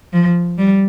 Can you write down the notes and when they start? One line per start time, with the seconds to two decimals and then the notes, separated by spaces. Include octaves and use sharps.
0.13 F3
0.58 G3